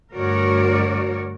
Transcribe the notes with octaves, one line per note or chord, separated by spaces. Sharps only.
D2 G2 F#4 A#4 C#5 D5